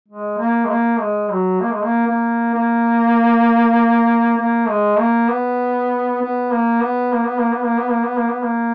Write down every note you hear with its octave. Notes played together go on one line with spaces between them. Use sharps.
G#3
A#3
G#3
A#3
G#3
F#3
A#3
G#3
A#3
A#3
A#3
A#3
G#3
A#3
B3
B3
A#3
B3
A#3
B3
A#3
B3
A#3
B3
A#3
B3
A#3
B3
A#3